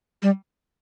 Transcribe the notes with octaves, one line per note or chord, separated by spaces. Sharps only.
G3